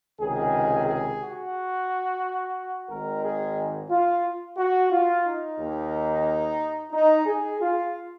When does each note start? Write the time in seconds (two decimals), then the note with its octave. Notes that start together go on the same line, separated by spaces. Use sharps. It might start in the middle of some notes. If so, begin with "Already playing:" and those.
0.19 C#2 C3 D#3 G#4
0.87 G#4
1.21 F#4
2.89 G#1 G#2 D#3 A#4
3.23 G#4
3.89 F4
4.58 F#4
4.91 F4
5.25 D#4
5.58 D#2 D#3
6.92 D#4
7.26 G#4
7.60 F4